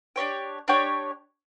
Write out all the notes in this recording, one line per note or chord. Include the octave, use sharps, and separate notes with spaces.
D4 G4 C#5 G5
D4 G4 C#5 G5